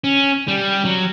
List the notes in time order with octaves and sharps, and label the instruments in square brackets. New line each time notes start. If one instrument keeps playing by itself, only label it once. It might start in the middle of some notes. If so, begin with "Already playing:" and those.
[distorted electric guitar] C#4
G3
F#3